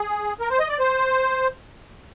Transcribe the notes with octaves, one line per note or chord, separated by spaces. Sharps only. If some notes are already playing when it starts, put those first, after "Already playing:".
Already playing: G#4
A#4
C5
D#5
D5
C5